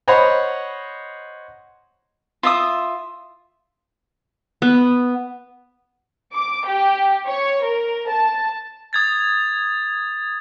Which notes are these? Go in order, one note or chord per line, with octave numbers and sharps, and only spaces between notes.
C5 C#5 D#5 F#5 A#5 B5
F4 E5 D#6
B3
D6
G4
C#5
A#4
A5
D#6 G#6 A6